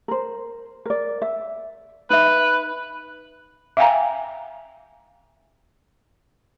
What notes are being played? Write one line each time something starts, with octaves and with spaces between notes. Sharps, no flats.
A#4 C5
A#4 D5
E5
D#4 B4 E5
E5 F5 G5 G#5 A#5